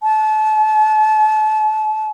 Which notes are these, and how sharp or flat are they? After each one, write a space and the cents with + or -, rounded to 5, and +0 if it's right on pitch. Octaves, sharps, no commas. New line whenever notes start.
A5 -35